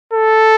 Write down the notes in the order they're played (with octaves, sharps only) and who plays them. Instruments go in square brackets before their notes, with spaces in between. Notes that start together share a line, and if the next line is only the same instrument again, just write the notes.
[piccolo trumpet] A4